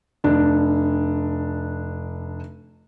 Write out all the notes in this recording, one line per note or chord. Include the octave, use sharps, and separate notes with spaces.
F1 D4